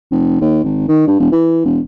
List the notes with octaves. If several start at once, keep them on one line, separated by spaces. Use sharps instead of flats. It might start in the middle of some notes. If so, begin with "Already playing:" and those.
F1
D#2
G#1
D#3
G2
E1
E3
E1